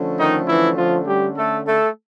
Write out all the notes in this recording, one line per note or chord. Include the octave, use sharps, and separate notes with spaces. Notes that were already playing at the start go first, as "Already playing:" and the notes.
Already playing: D3 F3 A3 C#4
D#3 D#4
E3 E4
F3 F4
G3 G4
A3 A4
A3 A4